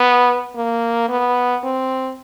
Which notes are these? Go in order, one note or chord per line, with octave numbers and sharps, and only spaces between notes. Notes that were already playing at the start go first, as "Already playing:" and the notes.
Already playing: B3
A#3
B3
C4